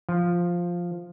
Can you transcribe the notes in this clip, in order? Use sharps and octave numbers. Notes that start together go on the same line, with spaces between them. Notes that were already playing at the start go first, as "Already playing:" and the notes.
F3